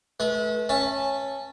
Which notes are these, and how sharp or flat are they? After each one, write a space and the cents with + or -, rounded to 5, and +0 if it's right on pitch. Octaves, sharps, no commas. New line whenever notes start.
A3 -35 B4 -35
C#4 -15 E5 +0 A5 +0